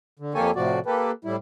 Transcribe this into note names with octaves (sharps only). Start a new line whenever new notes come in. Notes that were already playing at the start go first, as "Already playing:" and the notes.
D3
F2 A#3 G4 A4 C#5 G#5
A2 C3 F3 F#4 D5
A#3 G4 A4 B4
A2 G3 E4